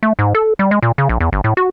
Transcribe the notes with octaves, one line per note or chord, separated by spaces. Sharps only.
A3
G#2
A4
G3
G#3
A#2
C#3
A#1
E2
G1
A2
F#4